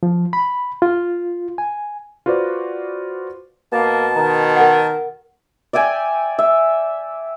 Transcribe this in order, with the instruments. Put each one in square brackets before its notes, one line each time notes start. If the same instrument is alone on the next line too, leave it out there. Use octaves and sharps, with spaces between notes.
[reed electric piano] F3
B5
F4
G#5
[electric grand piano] F4 F#4 B4 C5 D5
[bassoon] B2 [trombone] A#3 [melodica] A5
[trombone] D#3 [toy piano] A#5
[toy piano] A#4 F#5
[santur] D5 E5 G5 G#5
E5